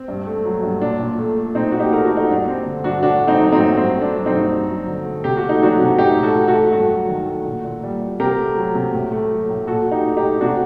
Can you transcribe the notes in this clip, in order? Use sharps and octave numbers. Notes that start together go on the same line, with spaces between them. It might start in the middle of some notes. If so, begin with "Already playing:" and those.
Already playing: C4
G2
A3
F#3
G2
A#2 D4
A#2
A3
A3
A#2 C4 D#4
A#2 F#4
D#4 G4
A3 A#4
F#4 A4
A3
D#4
G2 D4
G3 C4
D3
G2 D4 F#4
A2 D4 F#4
A3
C4 D#4
F#3
C4 D#4
A2
G2 C4
A3
D4
F#3
C4 D#4
G2
G2
F#3
D3
A3
C3 G4
F#4
A3
D#4
F#3 D4 F#4
C3
A2 D#4 G4
A2
F#4 A4
A3
F#4 A4
A3
G2 F#4 A4
F#3
D#3
A3
A#2
A#2
G3
G3
C3 G4 A#4
A3
F#3
C3
A2
A3
F#3
A2
A#2 F#4 A4
A#2
D#4 G4
A3
D#4 G4
A3
C3 D4 F#4